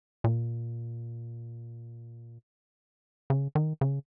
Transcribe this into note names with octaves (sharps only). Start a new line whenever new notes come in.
A#2
C#3
D#3
C#3